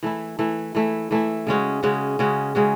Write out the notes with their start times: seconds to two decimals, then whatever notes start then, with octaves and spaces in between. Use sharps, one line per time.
0.03 E3 A3 E4
0.39 E3 A3 E4
0.75 E3 A3 E4
1.11 E3 A3 E4
1.47 C#3 G#3 C#4 F#4
1.83 C#3 G#3 C#4 F#4
2.19 C#3 G#3 C#4 F#4
2.55 C#3 G#3 C#4 F#4